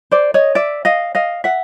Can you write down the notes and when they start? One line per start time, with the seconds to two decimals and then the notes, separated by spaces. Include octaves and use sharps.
0.11 C5 D5
0.34 C#5 D#5
0.55 D5 E5
0.85 D#5 F5
1.15 D#5 F5
1.44 E5 F#5